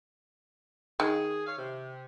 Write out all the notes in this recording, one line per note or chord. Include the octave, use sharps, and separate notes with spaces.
D#3 G#4
C#5 F5
C3